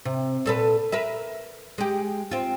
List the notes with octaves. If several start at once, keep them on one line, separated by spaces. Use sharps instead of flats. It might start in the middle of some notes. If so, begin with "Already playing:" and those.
C3
A#2 A4 B4
A#4 B4 E5
G#3 G4
C4 F4